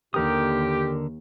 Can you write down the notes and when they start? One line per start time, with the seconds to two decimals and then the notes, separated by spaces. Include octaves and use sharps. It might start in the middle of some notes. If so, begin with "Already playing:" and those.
0.14 D#2 D3 G4 A#4 D#6